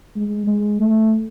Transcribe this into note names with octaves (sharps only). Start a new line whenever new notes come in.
G#3
G#3
A3